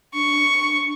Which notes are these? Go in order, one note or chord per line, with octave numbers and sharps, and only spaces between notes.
D4 C#6